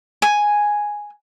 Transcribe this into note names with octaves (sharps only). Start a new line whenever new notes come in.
G#5